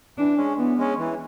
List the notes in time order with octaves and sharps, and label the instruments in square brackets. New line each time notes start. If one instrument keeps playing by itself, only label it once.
[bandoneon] E3 [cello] D4
[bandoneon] G#3 C#4
[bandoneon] E3 [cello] B3
[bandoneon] G#3 C#4
E3